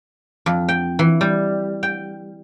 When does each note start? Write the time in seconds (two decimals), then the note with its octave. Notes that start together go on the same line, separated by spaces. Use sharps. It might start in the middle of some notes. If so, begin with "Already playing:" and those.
0.46 F2
0.68 G5
0.99 E3
1.21 G3
1.83 G5